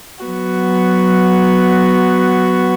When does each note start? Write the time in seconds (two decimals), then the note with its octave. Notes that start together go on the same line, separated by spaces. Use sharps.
0.24 F#3 B3 F#4